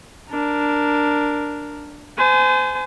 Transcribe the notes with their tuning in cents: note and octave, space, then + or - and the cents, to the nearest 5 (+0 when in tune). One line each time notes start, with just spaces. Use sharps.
D4 +0 A#4 +0
C5 -35 G#5 +15